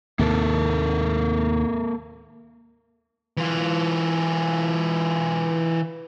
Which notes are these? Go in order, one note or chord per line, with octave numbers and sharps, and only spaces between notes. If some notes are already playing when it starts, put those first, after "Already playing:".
D#2 A2 C3 A#3 A4 A#4
E3 F4